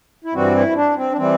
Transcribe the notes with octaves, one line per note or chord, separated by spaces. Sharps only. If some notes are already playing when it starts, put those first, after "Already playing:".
E4
G2 E3 G3 C4 F#4
E4
D4
C4
D4
E3 G3 C4